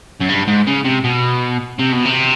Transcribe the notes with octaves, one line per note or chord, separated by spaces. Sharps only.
F#2
G2
G#2
C#3
C3
B2
C3
B2
C3